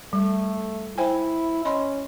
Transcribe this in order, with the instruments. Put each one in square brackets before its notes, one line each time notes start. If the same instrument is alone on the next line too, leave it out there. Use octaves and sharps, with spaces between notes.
[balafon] G3 [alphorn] A3
[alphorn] E4 [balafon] C5 G5 G#5
[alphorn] C#4 [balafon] D#5 B5 C6